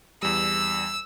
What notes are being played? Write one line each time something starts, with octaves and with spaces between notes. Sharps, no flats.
E2 G3 E6